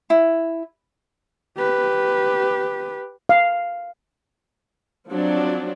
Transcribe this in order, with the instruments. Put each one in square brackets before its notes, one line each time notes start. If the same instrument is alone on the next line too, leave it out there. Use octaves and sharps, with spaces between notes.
[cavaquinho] E4
[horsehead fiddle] G4 B4
[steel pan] F5
[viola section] F3 F#3 C4 D4